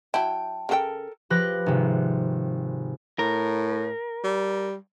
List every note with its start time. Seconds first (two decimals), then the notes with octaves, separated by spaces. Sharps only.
0.14 F#3 E4 G5 A5
0.69 C#3 F#4 A4 A#4 G5
1.30 F3 G4 B4 F#6 A#6
1.66 G#1 C3
3.19 A2 A#4
4.24 G3